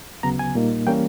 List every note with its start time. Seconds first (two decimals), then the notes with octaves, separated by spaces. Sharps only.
0.23 D2 C#3 F#3 B3 A#5
0.39 G#5
0.55 A#2 G3 A#3 D#4
0.87 E3 G3 A#3 C#4 G5